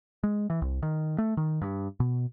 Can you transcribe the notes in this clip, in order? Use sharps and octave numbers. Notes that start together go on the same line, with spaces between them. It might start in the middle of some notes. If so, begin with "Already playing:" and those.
G#3
E3
C2
D#3
A3
D#3
G2
B2